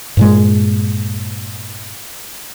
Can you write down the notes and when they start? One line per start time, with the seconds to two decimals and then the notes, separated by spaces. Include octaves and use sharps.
0.17 G2 A#2 G#3